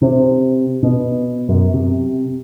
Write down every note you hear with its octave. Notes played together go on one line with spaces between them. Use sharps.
C3
B2
F#2
C3